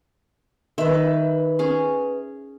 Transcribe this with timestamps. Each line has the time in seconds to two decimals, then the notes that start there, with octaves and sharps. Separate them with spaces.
0.78 D#3 B4 E5
1.59 C#4 G#4